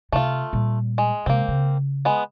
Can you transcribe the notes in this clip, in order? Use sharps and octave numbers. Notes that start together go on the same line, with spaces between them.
C3 A3 F4
A#2 G3
G#3
C3 G#3 A#3 C4
C#3
G#3 B3